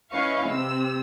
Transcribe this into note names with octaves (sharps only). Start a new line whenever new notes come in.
C#4 E4 B4 D#5 F5 C#6
C3 C4 E6